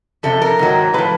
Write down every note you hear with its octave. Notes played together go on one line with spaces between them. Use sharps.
F2 C3 A4
A#4
G#2 D#3 F#3
A2 F3 B4